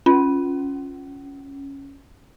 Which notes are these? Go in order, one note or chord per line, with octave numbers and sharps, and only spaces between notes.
C#4 F4